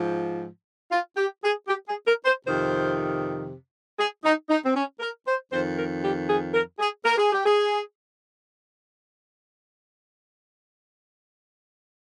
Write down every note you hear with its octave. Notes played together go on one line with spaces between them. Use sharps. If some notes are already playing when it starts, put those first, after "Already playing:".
Already playing: G#2 F3
F4
G4
G#4
G4
G#4
A#4
C5
F2 C3 D#3 C5
G#4
D#4
D#4
C4
C#4
A#4
C5
F2 D#3 C5
A#4
G4
G#4
A#4
G#4
A#4
G#4
G4
G#4